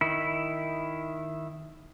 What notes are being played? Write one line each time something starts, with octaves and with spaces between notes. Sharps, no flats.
D#3 E4